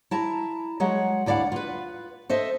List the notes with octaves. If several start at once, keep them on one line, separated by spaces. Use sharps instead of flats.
E4 A5 A#5
F#3 G#3 C#5 F#5
D2 E4 D5 F5 F#5
F4 B4
A4 C5 D#5 E5